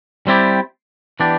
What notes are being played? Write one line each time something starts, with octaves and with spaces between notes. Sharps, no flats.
G3 C4 E4 G4 D5
E3 B3 D4 G4 D5